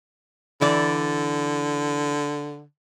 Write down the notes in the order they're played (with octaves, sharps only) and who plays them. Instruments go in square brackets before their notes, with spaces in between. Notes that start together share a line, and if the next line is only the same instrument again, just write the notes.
[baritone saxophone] D3 [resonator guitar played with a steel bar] E3 D5